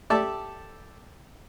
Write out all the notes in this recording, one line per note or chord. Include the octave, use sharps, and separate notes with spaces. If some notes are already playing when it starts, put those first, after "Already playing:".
G4 A4 D5 E5 A5